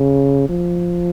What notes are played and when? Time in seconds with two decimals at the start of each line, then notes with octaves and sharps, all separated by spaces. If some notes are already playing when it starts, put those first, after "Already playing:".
Already playing: C#3
0.49 F3